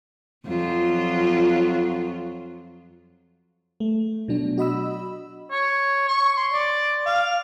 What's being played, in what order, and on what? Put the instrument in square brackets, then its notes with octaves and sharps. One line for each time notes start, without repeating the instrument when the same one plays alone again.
[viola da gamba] F2 F#3 F4
[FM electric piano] A3
B2 F#3 D4
F#4 D#5 B5 E6
[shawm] C#5
C#6
C6
D5
F5